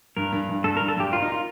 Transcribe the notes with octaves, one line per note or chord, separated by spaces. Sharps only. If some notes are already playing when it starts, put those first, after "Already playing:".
G2 A#4
G2
G2
G2 A4
A#4
G2
A4
G2 G4
F4 A#4
D#4
F4 A#4